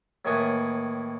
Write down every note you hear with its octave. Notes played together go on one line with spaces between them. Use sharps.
D#2 A2 D#3 E3 C#5 D#6